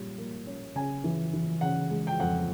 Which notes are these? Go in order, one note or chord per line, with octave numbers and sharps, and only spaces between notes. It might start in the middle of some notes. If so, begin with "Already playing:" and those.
Already playing: A#2 G3 C#4
A#3
C#4
C#3 G#5
E3
E3
C#3 F#5
G#3
G5
F2 F#5